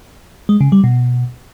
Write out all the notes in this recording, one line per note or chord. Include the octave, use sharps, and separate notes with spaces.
G#3
C#3
G3
B2